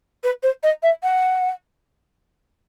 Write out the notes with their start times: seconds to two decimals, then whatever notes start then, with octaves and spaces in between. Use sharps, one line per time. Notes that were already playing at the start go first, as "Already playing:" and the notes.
0.24 B4
0.43 C5
0.63 D#5
0.83 E5
1.03 F#5